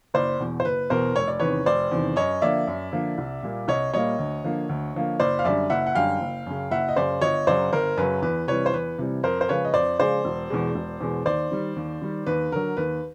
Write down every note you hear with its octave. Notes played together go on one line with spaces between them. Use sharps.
F#1 C5 D5
E2 B2
C5
F#1 B4
E2 B2 A#4 C5
F1 C#5
D5
E2 C3 D#3 B4 C#5
F1 C5 D5
E2 C3 D#3
F#2 C#5 D#5
D3 F3 A#3 D5 E5
F#2
D3 F3 A#3
C2
A#2 G3 A#3
C2 C#5 D#5
A#2 G3 A#3 C#5 D#5
D2
D3 F3 A#3
D2
D3 F3 A#3
F#1 C5 D5
F5
F#2 D3 G3 D5 E5
F#1 E5 F#5
F#5
F#2 D3 G3 F5 G5
F#1
F#2 C#3
F#1 E5 F#5
D#5
F#2 C#3 C5 D5
G1 C#5 D#5
F#2 C#3 F#3 C5 D5
G1 A#4 C5
F#2 C#3 F#3 B4
E2 B4
C3 E3 G3 B4 C#5
C5
E2 B4
C3 E3 G3
F2 A#4 C5
C5
C#3 F3 G#3 B4 C#5
D#5
F2 C5 D5
C#3 F3 G#3 C5 D5
E1
E2 B2 G#3
E1
E2 B2 G#3
D#2 C5 D5
D#3 G3
D#2
D#3 G3
D#2 B4
D3 F#3 A#4
D#2 B4